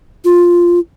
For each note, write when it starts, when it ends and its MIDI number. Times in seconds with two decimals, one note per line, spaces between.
0.25 0.79 65